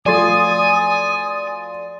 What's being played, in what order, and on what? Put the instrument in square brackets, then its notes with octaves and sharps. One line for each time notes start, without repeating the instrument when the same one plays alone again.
[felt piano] F3 F#3 A3 [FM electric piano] D5 C6 A6 [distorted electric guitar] G#5 [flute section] D#6